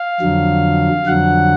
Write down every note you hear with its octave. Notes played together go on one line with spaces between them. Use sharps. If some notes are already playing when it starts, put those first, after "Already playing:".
Already playing: F5
F2 D3 F#3
F2 D3 F#3 F#5